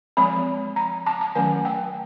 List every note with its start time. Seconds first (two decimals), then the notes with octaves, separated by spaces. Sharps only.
0.17 F3 G#3 C4 B5
0.76 A#5
1.06 A5
1.21 A5
1.35 D#3 F#3 A3 C#4 G#5
1.65 G5